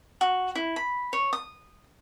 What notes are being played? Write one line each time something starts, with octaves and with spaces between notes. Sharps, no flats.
F#4
E4
B5
C#5
D#6